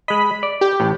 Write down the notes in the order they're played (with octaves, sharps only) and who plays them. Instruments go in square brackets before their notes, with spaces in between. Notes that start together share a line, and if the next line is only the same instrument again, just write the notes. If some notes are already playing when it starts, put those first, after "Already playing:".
[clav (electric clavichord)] G#3 D#5 [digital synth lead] B5
[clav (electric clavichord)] D5
[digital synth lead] G4
[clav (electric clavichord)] A1 A2